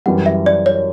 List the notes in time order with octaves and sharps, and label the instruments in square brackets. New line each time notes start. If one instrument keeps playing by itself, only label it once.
[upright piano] F#2 E3 G3 [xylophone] F#5
[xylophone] E5
D5
C#5